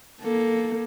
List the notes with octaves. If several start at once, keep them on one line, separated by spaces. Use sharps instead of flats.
A#3 A4